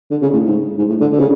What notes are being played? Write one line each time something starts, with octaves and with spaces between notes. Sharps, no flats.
D3
C#3
A2
G#2
G#2
A2
D3
D3
C#3